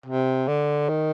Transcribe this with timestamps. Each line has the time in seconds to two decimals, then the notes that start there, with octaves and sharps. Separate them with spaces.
0.06 C3
0.48 D3
0.89 D#3